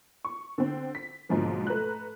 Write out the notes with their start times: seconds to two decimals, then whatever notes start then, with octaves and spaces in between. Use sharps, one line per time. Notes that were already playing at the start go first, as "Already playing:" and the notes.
0.25 C#6
0.58 D3 C4
0.95 B6
1.29 G#2 B2 D3 F3 F#3 A#3
1.67 A3 B4 A#5 F#6